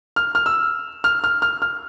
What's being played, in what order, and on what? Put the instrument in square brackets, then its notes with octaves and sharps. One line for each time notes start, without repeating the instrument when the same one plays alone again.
[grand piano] F6
F6
E6
F6
F6
F6
F6